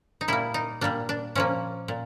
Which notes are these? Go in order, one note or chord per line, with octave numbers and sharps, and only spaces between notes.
D#4
A#2 G3 A#3 E4
D#4
A#2 G3 A#3 D4
D4
A#2 F3 A#3 C#4
A#2